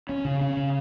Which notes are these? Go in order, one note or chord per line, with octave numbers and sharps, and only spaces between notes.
C#4
C#3
C#4
C#3